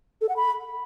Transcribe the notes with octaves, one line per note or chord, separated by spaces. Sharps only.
A4
F#5
B5